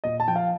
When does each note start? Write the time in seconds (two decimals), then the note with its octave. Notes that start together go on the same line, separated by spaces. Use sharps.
0.04 A#2 D#5
0.20 A5
0.27 F3 G5
0.36 F5